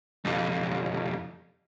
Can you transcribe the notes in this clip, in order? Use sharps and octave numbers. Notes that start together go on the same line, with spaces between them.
B1 F2